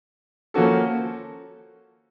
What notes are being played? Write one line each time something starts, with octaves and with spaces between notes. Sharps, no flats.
F3 A#3 C#4 F#4 A4